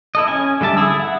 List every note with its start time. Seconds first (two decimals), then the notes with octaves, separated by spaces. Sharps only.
0.15 E4 A4 D#5
0.28 C#4 G#5
0.61 D3 G3 E5 A5
0.77 E4 G#4 E6
1.00 E5 F#5